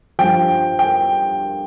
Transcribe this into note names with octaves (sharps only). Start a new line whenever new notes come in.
G2 F3 G5
G5